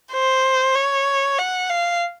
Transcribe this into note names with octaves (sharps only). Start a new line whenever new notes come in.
C5
C#5
F#5
F5